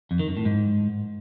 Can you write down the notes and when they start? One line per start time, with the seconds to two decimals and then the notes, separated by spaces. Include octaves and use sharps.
0.11 F2
0.19 D#3
0.28 F#2
0.37 A2
0.45 G#2